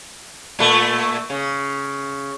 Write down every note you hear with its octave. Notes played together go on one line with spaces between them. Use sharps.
A#2 A3
C#3